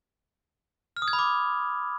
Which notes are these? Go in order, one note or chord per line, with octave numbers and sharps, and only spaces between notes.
F6
D#6
G#6
B5
D6